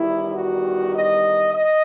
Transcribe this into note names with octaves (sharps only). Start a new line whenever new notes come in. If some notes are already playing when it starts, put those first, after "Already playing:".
Already playing: E2 D#3 G3 E4
F#4
D#5
D#5